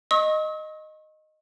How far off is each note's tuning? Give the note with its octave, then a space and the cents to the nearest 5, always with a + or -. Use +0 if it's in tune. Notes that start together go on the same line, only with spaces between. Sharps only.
D#5 -5 C#6 -35 E6 -45